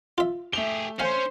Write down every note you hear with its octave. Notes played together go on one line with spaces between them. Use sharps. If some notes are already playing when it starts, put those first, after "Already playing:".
F4 E5
A3 G4 G#4 F7 G7
C#4 C5 F5 G#5